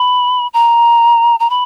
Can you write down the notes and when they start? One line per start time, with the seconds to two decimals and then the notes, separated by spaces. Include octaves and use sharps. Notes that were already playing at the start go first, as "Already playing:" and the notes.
Already playing: B5
0.54 A#5
1.40 A#5
1.50 B5